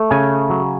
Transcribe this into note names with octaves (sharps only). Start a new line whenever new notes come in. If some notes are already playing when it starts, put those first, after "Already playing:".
Already playing: A3
C#3 G#5
F#3